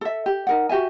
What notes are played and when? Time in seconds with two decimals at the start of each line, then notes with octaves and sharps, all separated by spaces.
0.01 A4 E5
0.26 G4
0.47 D#4 A#4 F#5
0.69 F#4 G4 E5 G#5